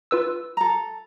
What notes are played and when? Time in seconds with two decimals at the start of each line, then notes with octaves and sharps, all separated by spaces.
0.11 F4 B4 E6
0.57 A4 A#5